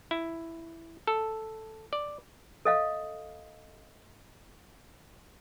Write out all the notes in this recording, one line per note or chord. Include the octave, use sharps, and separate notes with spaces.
E4
A4
D5
A4 D#5 F5